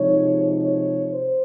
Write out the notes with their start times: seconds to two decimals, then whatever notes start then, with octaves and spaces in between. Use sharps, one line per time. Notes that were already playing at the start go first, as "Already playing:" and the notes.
Already playing: C3 F3 G#3 D#4 C#5
0.63 C#5
1.12 C5